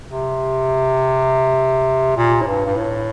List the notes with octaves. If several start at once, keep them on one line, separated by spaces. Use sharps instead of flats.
C3
A#2
A2
G2
G2
A2